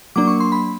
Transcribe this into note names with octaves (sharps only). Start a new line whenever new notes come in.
F#3 A#3 D4 D6
C#6
C6
B5